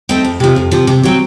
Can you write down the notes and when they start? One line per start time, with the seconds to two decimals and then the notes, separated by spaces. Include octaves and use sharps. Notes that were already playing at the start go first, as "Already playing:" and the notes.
0.09 A3 C4 D#4
0.25 F2
0.40 C3 F3
0.56 F2
0.72 C3 F3
0.87 C3
1.03 F#3 C4